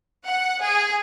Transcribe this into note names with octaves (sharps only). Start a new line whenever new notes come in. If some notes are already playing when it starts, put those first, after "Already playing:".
F#5
G#4